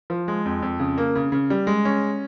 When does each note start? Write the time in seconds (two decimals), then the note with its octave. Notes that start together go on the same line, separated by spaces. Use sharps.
0.10 F3
0.28 G#3
0.45 F2
0.62 F2
0.79 C#3
0.98 A#3
1.15 C#3
1.32 C#3
1.50 G3
1.67 G#3
1.85 C#4